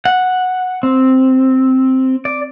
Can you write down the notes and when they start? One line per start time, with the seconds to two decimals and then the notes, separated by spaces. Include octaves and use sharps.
0.05 F#5
0.83 C4
2.25 D5